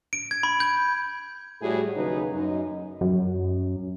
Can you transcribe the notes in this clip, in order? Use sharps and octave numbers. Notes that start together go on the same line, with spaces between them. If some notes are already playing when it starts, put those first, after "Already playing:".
D7
G#6
B5
G6
A2 G3 F#4 G#4
D#2 C#3 F#3 D#4 B4
F#2 D#4
F#2